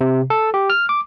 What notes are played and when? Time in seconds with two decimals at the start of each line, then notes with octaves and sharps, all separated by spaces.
0.01 C3
0.30 A4
0.54 G4
0.70 F6
0.89 D6